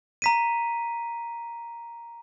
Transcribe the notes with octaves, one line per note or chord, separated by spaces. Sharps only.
A#5 B6 D#7